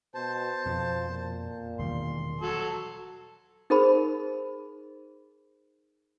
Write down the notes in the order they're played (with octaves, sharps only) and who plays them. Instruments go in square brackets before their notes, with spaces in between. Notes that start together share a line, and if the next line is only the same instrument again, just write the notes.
[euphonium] B2 [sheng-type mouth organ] C5 A5
[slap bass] F2 B2 [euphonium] F3
[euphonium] A#2
[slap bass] E1 D#3 G3 [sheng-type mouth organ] C6
[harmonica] F#3 A4
[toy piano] D#4 G#4 A#4 C5 B5